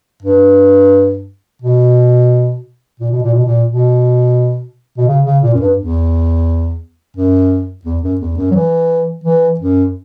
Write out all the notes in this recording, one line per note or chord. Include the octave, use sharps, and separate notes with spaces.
G2
B2
A#2
B2
A#2
B2
A#2
B2
B2
C#3
C#3
A#2
F#2
G2
E2
F#2
E2
F#2
E2
F#2
F#3
E3
E3
F#2